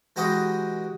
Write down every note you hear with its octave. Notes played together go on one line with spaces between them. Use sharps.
E3 G#3 F#4 G4 D#5